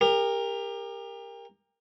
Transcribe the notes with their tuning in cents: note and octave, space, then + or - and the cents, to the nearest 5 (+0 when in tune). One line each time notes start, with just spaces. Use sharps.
G4 +35 A#4 +0